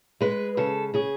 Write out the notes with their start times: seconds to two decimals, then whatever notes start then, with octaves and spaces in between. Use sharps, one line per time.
0.21 G#3 B4
0.57 C#3 A4
0.94 C#3 G#4